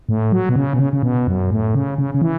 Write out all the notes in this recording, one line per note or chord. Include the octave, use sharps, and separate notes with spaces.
A2
F#3
B2
C#3
B2
C#3
C#3
B2
F#2
A2
C#3
C#3
C#3
E3